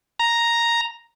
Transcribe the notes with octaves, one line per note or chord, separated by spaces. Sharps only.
A#5